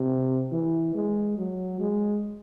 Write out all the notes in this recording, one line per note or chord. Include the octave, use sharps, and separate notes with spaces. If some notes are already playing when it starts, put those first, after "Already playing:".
Already playing: C3
E3
G#3
F#3
G#3